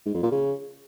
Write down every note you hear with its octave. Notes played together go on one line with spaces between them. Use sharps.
G#2
F2
A#2
C#3